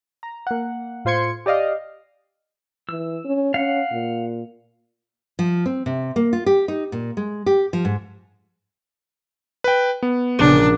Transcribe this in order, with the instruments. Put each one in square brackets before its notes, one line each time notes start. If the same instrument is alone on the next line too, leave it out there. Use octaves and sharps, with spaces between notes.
[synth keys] A#5
A#3 F#5
A2 F4 C5 C6 G#6 C#7
G4 D5 D#5 F5
[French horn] E3 [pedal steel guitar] E6
[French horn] C#4
[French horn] C#4 [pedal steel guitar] F5 F#5
[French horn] A#2
[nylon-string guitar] F3
C4
C3
A#3
F4
G4
D#4
A#2
G#3
G4
F3
G#2
[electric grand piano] B4 G5
B3
[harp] A#1 A#2 C#3 [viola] D4